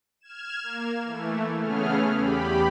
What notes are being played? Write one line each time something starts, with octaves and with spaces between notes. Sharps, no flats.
F6 G#6 E7
A#3
E3 A3
C#3 A3 B3 C#4 G#4 F6
E2 G4 B5